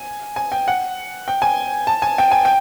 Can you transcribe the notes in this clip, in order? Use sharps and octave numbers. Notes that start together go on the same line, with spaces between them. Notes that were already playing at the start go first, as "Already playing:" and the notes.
Already playing: G#5
G#5
G5
F#5
G5
G#5
A5
G#5
G5
G#5
G5